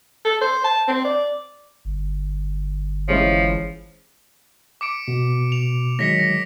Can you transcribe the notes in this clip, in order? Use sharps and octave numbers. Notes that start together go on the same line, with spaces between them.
A4
C5
A5
C4
D5
G1
E3 F3 G#3 C#4
D6 C#7 D7
B2
F7
D#3 F#3 G#3 A#6 B6 C#7
A#6